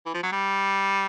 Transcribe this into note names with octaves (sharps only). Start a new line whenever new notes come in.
E3
F3
F#3
G3